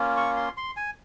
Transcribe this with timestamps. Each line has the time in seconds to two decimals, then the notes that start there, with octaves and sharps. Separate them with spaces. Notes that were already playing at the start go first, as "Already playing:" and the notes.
Already playing: A#3 C#4 F4
0.16 C#6
0.37 C6
0.57 C6
0.77 G#5